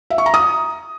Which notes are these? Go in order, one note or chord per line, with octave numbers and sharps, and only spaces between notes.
E5
C#6
A#5
D#6